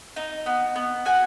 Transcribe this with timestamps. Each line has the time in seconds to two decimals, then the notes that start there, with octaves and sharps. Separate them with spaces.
0.16 D#4
0.46 B3
0.76 B3
1.05 F#4 G#5